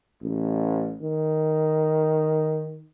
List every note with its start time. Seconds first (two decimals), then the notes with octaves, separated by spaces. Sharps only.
0.23 A1
1.02 D#3